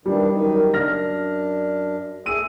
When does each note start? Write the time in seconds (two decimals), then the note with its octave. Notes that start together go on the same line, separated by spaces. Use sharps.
0.06 D#3 E3 G3 D4
0.32 F#2 D#3 D#4
0.74 F#2 D4 F6 A#6
2.26 A3 G#4 E6 D#7